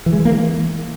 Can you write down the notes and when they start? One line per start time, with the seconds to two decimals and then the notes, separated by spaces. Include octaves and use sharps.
0.06 E3
0.13 G#3
0.19 E3
0.25 A#3
0.32 E3